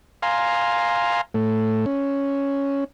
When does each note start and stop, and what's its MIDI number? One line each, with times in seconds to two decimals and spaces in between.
0.22 1.21 77
0.22 1.21 80
0.22 1.21 82
0.22 1.21 84
1.34 1.85 45
1.34 1.85 57
1.86 2.84 61